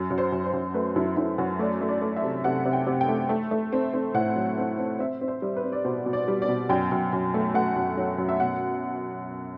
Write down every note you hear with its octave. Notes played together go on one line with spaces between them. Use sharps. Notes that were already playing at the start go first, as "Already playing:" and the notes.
Already playing: F#2
F#2
C5
F#2
C5
F#2
A3 B4
F#2 E4
F#2 E4
F#2 F#4
A3 D5
A3
D5
A3
E5
C3
C3 F#5
C3
G5
C3
G5
A3
A3
A3
C4
C4
A2 F#5
F#3
C4
C4
C4 E5
C4
C5
G3
B4
C4
D5
B2 C5
B2
D5
G3
D5
B2
F#2 G5
F#2
F#2
A3
A3 F#5
F#2
F#3
F#2
E5
B2 F#5